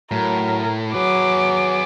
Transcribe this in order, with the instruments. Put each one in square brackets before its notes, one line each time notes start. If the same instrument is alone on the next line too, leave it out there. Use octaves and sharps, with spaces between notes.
[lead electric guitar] A2 [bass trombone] F#3 [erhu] A#4
[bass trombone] F#3 [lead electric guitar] G#4 B4 [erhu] D6